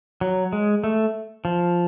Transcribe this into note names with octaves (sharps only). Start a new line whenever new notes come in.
F#3
G#3
A3
F3